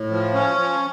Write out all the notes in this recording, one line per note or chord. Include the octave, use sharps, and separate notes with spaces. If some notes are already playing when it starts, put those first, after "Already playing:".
Already playing: A2
F3
C#4
F3